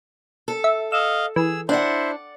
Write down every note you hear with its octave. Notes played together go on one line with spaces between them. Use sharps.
A4
E5
D#5 F5 E6
E3 G#4 E6
D4 E4 C5 D5 F#5